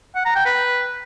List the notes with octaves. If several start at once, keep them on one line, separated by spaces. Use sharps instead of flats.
F#5
A#5
G5
B4